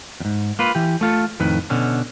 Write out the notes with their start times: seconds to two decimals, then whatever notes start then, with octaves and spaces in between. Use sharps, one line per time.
0.20 E2 G#2
0.59 A#3 F4 B4
0.75 E3 G4
1.01 A3 F4 A4
1.40 F2 A2 D#3 B4
1.70 B2 D3 C#4